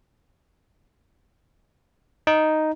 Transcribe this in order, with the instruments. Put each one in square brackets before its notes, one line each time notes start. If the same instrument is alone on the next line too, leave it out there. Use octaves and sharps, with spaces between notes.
[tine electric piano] D#4